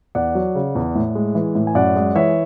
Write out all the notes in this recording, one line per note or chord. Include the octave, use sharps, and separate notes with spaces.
E2 D5 F#5
F#3
C#3
E2
A2
G#3
E3
A2
G#5
F#2 D5 F#5
G#3
E3 C#5 E5